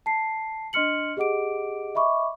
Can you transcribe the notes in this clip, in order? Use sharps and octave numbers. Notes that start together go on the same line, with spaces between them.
A5 C7
D4 D#5 C6 F6 C#7 F#7
G4 G#4 D#5 F#5 D6 D7
D#5 E5 B5 C#6 D6